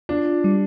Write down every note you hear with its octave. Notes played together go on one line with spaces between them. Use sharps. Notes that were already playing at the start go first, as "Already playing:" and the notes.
D4 F4
G3